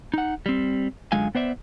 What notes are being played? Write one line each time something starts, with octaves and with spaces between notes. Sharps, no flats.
D#4 F#5
G3 C4
F#2 D3 G#3 F4 F5 G#5
B3 C5 D5 E5